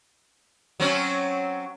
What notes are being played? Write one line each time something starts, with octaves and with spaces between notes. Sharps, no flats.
F#3 C4 C#4